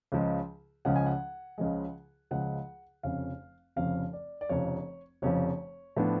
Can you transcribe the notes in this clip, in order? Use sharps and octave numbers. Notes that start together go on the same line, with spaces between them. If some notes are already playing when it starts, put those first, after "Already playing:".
C#2 C#3 F3 G#3
C#2 C#3 F3 G#3 F#5
G#5
F#5
C#2 C#3 F3 G#3
C#2 C#3 F3 G#3 F#5
F1 F2 C#3 F3 F5
F1 F2 C#3 F3 F5
D5
D5
F1 F2 C#3 F3 C#5
F1 F2 C#3 F3 C#5
A2 F3 B3 D4